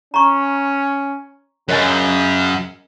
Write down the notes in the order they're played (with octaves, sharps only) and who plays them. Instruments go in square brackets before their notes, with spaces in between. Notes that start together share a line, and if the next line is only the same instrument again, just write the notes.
[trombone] C#4 [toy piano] A#5 C#6
[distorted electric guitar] F#2 [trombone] C#3 [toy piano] A#4 D#5 G#5